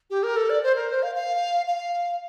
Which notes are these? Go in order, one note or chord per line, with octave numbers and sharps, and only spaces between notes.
G4
A#4
A4
D5
C5
A#4
C5
F5
F5
F5